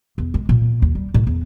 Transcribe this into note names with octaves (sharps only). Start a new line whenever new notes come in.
E2
G#3
A#2
D#2
G3
A2
E2